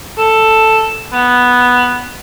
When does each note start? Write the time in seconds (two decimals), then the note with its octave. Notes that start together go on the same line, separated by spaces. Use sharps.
0.18 A4
1.12 B3